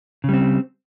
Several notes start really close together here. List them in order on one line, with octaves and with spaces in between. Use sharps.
C#3 G3 C4